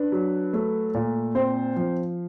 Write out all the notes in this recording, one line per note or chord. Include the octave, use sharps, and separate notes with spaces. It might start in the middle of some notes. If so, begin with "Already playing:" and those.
Already playing: D4 B4
F#3
A3
A#2
C4 C5
F3